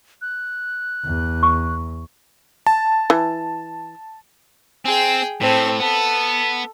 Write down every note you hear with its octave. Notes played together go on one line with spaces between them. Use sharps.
F#6
E2
C#6
A5
E3
C4 G#4 G5
A2 C4 A4
B3 A4